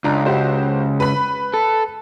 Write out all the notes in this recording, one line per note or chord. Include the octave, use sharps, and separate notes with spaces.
C#2 D4 A#5
F#4 G4 C5
B4 B5
A4